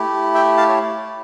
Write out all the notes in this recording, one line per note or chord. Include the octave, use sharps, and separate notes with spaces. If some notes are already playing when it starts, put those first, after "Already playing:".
Already playing: A3 E4 G4
E5 G5
F5 A5
C#5